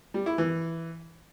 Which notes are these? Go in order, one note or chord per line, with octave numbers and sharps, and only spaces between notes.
G3
E4
E3